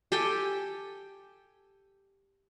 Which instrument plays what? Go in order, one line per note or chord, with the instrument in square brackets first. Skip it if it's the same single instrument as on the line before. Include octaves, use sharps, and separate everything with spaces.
[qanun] G4 A4 G5 G#5